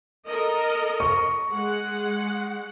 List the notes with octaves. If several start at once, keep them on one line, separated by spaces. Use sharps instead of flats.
A4 A#4 D#5
C#6
G#3 F#5